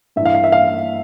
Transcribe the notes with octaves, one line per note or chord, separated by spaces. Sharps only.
G2 E3 E5 F5
F5
E5
F5